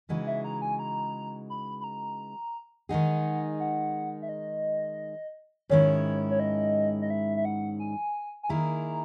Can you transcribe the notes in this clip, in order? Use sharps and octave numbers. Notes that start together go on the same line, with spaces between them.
C#3 E3 G#3 D#4 F#4
E5
A#5
G#5
A#5
B5
B5
A#5
D#3 G#3 D#4 G#4 F#5
F#5
E5
D#5
G#2 D#3 G#3 C#4 E4 C#5
C#5
D#5
D#5
E5
E5
F#5
G#5
G#5
D#3 A#3 E4 G#4 A#5